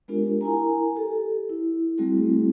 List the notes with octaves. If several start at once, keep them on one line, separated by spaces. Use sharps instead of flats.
G#3 B3 D4 F4 G4 A#4
E4 A#4 G#5 A#5
G4 A4
E4
G3 A3 C4 E4 F#4 G#4